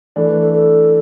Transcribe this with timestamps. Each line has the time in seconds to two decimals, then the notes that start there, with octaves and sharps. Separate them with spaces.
0.16 E3 A3 D4 A4
0.28 B4
0.41 A4
0.53 A4